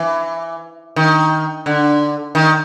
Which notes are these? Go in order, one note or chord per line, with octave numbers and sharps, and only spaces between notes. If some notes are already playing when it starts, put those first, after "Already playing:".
Already playing: E3
D#3
D3
D#3